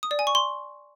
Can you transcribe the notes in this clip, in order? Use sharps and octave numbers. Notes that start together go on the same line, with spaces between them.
D#6
D5
G#5
C#6
C6